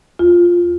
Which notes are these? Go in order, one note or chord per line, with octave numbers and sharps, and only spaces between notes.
E2 F4